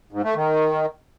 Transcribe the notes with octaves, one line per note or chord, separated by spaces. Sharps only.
G#2
A3
D#3